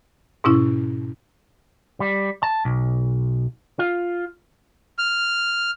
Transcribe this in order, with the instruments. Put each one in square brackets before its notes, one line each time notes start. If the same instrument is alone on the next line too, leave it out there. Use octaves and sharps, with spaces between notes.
[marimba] G#2 B2 C#4 E4
[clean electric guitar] G3
A5
B1
F4
[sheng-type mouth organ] F6